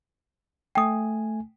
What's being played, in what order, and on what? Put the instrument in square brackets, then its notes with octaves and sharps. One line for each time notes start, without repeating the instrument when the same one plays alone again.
[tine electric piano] A3 G#5 [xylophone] G5 D#6